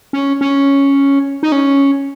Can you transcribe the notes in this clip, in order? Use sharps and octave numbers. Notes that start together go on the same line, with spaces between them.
C#4
C#4
D#4
C#4